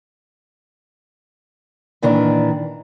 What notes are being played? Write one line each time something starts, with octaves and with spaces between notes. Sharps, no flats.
A#2 D#3 E3 D4 E4